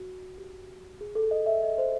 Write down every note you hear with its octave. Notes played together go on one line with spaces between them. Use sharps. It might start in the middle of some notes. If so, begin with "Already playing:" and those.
Already playing: F#4
G4
G#4
A4
D#5
E5
D#5
C5